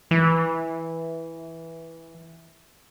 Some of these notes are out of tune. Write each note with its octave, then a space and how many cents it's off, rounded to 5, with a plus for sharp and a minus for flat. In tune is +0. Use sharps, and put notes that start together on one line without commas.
E3 -5